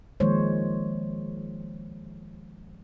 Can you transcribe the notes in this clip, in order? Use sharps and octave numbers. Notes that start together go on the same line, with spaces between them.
D#3 F3 G#3 A#3 C5 C#5